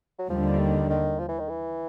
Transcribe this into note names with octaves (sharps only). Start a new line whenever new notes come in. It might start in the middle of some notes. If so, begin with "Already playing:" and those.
F#3
D#2 D3 F3 G3
D#3
D#3
F3
E3
D#3
E3